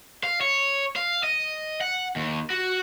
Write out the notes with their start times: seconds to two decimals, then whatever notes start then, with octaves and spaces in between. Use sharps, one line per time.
0.24 F5
0.41 C#5
0.96 F5
1.23 D#5
1.81 F#5
2.16 D#2
2.50 F#4